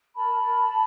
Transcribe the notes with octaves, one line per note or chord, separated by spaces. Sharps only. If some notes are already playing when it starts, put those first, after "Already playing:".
A#4 A5 B5
A#4